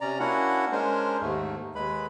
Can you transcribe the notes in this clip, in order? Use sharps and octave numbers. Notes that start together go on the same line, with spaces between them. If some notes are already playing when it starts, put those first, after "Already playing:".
C3 C#4 D5 A#5
A#3 C#4 D4 E4 F#4 F#5
G#3 C#4 D4 A#4 C5
D#2 G#2 A3
D#2 G#3 B4 B5